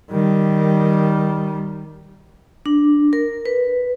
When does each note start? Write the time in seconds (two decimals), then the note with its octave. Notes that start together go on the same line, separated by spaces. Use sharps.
0.11 D#3 G3
2.66 D4
3.13 A#4
3.46 B4